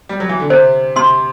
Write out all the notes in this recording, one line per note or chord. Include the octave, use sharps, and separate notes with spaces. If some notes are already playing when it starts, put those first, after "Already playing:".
G3
F#3
E3
D3
C3 C5
C3 C6